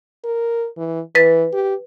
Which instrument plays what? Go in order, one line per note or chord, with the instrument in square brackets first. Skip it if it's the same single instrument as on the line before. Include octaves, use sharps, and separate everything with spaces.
[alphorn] A#4
E3
[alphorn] E3 [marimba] B4 A6
[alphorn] G4